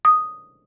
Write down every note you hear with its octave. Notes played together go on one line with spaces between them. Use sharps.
D#6